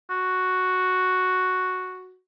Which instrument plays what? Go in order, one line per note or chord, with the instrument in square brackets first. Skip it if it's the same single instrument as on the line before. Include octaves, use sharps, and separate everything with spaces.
[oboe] F#4